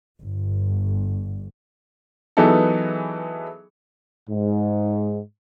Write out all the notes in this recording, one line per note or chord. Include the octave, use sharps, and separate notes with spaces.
G1
E3 F#3 B3 D#4 G#4 A4
G#2